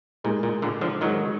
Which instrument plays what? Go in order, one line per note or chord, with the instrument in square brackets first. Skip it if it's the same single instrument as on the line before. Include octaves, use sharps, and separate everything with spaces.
[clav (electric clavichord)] A#2 [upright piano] G#3 D#4 A#4
[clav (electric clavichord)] A#2
A#2 D3
D3 F3
[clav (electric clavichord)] D#3 F#3 [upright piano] G#3 D#4 A#4